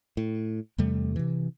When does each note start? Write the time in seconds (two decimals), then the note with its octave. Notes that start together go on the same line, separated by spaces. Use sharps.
0.17 A2
0.78 E2 C3 G3 A3
1.16 C3 E3